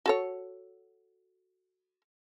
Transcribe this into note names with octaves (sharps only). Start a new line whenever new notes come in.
F#4 A4 C#5